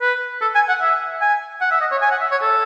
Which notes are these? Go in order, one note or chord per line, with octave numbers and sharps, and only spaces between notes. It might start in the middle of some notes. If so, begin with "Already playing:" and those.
B4
A4
G#5
F#5
E5
G#5
F#5
E5
D#5
C#5
G#5
F#5
E5
C#5
A4